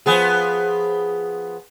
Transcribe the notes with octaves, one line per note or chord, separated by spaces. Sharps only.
F3 B3 G#4